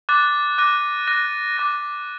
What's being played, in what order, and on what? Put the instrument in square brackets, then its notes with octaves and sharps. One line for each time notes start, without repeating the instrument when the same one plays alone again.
[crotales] D6 F#6 A6
D6 F#6 A#6 D#7
D6 F#6 A#6 D#7
D6 F#6 A#6 D#7